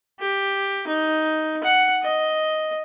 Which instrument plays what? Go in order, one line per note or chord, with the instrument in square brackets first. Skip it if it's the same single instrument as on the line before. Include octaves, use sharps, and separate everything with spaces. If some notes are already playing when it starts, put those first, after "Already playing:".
[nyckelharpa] G4
D#4
F#5
D#5